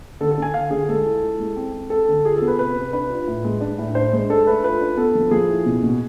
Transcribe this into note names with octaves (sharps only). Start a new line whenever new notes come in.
D3 A4
A4
D3 G#5
D3 F5
D3 G#4
G#3 A4
E4
E4
G#3
C4
C4
C4 A4
D3
F4 G#4
A4
B3
B4
C3 B4
C3
D4 B4
F4
A2
G#3
D4
A2
D4 C5
G#3
D4 A4
A3 B4
F4 B4
D4
B3 A4
F3
F3 G#4
E4
B2
B2